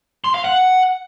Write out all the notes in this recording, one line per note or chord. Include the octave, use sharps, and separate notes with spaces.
C6
F5
F#5